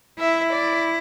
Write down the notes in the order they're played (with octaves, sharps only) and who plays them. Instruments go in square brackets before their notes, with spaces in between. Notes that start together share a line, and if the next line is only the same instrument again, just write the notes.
[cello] E4 [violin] E5
[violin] D5